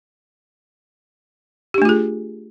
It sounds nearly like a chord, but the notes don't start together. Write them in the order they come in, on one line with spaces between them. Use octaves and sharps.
G4 D4 A3 F4 G#4